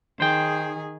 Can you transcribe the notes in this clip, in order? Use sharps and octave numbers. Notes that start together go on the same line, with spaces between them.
D#3 G#4 C5 G5